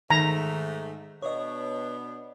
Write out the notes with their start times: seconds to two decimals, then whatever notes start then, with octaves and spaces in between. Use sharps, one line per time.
0.10 G#2 D#3 A3 A#5
1.22 B2 B3 D4 C#5 D#5